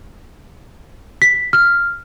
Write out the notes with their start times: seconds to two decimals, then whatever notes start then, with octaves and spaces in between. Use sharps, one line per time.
1.22 B6
1.53 F6